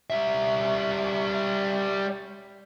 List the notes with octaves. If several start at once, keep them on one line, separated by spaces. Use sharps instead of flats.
G3 E5